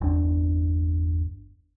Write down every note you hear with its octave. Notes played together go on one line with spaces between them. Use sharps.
G1 E2 D4